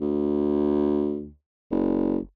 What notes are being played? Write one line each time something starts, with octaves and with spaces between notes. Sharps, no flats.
D2
F#1